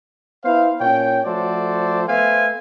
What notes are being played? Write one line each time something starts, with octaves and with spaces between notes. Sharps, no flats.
B3 E4 C5 F5
A#2 C#4 C#5 G5
F3 A3 F#4 A4 C5 D5
A3 B3 C5 E5 F5 G#5